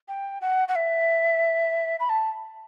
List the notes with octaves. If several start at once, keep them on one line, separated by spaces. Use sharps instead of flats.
G5
F#5
F#5
E5
B5
A5